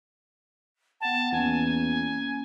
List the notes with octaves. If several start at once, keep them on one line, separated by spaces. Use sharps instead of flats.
B3 F#5 G5 A5
E2 A#3 C#4 G#5